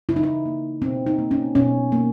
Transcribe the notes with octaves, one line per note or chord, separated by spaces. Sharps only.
C#3 E4
D#4
E4
A#3
B2 C4
D#4
A#3
C#4
B2 C#4
A#3